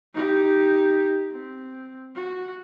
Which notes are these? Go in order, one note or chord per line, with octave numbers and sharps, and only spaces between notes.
D#4 G4
C4
F#4